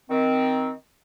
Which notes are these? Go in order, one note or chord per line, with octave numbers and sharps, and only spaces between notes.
D#3 C4